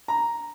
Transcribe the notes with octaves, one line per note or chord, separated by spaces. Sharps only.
A#5